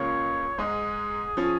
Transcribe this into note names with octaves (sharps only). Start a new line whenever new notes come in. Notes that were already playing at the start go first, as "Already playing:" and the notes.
Already playing: C#2 C#3 A#3 F4 C#5
G#2 G#3 D#4 G#4
F3 C#4